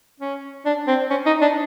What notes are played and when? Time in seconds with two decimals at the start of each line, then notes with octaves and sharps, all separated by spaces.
0.20 C#4
0.65 D4
0.87 C4
1.10 C#4
1.26 D#4
1.41 D4